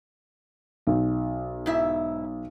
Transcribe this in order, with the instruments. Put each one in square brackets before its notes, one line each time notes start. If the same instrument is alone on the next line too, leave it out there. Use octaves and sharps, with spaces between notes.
[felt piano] B1
[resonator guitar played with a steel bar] G#2 E4 E5